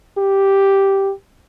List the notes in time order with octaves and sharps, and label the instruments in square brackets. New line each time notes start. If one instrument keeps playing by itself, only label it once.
[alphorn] G4